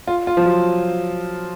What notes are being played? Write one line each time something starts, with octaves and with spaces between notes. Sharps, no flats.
F4
F4
F3
F#3